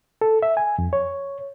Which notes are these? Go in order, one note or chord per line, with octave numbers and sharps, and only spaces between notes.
A4
E5
G#5
F2
C#5